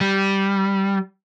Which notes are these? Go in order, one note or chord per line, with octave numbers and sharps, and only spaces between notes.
G3